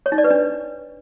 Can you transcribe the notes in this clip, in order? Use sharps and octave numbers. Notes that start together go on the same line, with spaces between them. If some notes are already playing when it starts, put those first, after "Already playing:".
C#5
D#4
D5
B4
D4